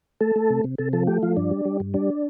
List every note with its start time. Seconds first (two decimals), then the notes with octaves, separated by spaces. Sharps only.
0.21 A3 A4
0.36 A3
0.50 C3
0.64 C3
0.78 C3 A4
0.93 F3 A4
1.07 A3 G4
1.23 F3 F4
1.37 G2 D4
1.51 G3
1.65 G3
1.80 G2
1.94 G3 D4